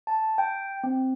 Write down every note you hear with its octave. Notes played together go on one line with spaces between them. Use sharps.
A5
G5
C4